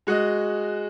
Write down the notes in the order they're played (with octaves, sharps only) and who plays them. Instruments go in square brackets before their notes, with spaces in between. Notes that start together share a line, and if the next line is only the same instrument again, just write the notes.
[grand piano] G#3 F#4 D#5